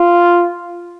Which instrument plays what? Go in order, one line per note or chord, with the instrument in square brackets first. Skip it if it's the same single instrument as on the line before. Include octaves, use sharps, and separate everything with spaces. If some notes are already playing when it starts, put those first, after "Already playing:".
Already playing: [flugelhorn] F4